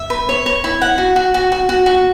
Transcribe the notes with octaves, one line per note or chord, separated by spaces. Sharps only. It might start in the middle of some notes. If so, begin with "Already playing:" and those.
Already playing: E5
B4
C#5
C#5
E4
F#5
F#4
F#4
F#4
F#4
F#4
F#4